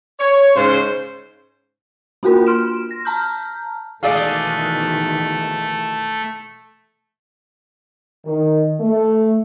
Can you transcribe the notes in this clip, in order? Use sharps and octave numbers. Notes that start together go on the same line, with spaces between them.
C#5
G#2 C#3 C5
A#3 D4 F4 F#4 A#4
C6 F6 D7 E7
A#6
A5 A#5 F6 G6
B2 D#3 E3 G#3 A3 G#4 D5 F5
D#3
A3